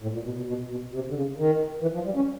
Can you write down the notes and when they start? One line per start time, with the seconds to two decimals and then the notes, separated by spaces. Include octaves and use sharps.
0.02 A2
0.13 A#2
0.25 B2
0.37 B2
0.47 B2
0.69 B2
0.93 C3
1.09 D3
1.15 C#3
1.38 D#3
1.82 E3
1.94 F3
2.05 G3
2.16 C#4